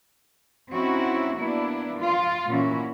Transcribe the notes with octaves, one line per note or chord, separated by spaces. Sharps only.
C4 C#4 D#4 E4 F#4
A#3 B3 D4 E4
F4
A#2 E3 A#3 C#4 E4 F#4